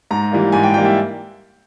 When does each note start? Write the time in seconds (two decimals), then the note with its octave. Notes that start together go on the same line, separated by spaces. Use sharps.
0.11 G#2 A#5
0.32 E3 G3 A#3
0.52 G#2 G#5
0.63 G5
0.74 E3 G3 A#3 G5
0.85 E5